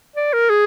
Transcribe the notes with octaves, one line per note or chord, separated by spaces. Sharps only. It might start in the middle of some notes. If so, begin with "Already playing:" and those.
D5
A#4
G#4